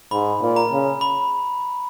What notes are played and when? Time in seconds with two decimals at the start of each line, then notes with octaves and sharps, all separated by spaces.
0.11 G#2 B5
0.42 A#2
0.56 A#5
0.72 C#3
1.01 B5